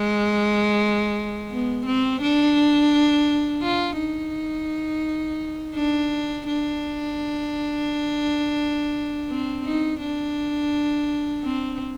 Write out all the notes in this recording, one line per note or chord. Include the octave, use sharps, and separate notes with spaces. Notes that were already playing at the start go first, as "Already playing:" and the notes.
Already playing: G#3
B3
C4
D4
F4
D#4
D4
D4
C4
D#4
D4
C4